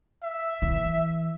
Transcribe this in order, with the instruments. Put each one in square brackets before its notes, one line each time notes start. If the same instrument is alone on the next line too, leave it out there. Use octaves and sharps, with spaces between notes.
[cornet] E5
[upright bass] E3